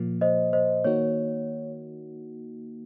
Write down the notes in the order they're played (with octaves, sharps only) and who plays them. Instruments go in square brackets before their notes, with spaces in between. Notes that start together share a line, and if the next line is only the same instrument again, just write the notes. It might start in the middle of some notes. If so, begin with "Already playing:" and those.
Already playing: [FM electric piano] A#2 F3 A#3
[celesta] C5 D#5
C5 D#5
[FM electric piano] D#3 A#3 D#4 F#4 [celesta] C#5